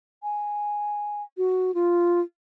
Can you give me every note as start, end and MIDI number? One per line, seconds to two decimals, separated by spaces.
0.23 1.23 80
1.37 1.74 66
1.74 2.20 65